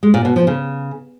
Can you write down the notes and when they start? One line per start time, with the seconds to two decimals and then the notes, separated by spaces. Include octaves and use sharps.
0.03 G#3
0.14 A#2
0.25 B2
0.36 F3
0.47 C#3